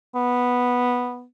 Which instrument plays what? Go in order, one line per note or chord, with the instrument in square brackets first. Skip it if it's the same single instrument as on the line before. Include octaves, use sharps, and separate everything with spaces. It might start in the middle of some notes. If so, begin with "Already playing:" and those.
[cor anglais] B3